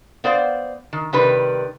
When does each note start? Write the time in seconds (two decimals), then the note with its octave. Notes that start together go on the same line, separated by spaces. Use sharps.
0.24 B3 C5 D5 F5
0.93 D#3
1.13 C3 D#3 G3 B4